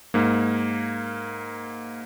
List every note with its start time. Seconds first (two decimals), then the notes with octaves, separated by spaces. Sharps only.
0.14 G#2 A#3